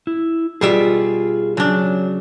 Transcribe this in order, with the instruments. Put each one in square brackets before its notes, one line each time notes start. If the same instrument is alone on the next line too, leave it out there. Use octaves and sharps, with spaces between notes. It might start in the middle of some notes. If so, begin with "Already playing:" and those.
[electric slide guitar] E4
[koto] B2 G3 E5 [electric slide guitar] F4 G#4
[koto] C#3 D4 [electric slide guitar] F#3